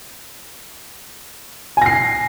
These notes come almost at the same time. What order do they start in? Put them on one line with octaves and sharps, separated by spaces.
G#5 A#6 C7